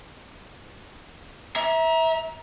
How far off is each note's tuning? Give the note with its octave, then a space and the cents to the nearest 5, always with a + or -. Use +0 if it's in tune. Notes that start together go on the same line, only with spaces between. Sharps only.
E5 -20 A#5 +20